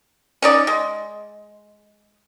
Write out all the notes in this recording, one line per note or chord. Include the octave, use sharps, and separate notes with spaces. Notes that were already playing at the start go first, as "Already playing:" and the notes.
C#4 D#4 D5
G#3